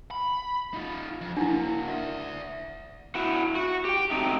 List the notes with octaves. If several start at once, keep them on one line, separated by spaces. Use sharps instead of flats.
B5
D#4 F4
F2
A#3 D4 E4 F#4
D5 E5
E4 F#4
F#4
G4 G5
A3 C4 D#4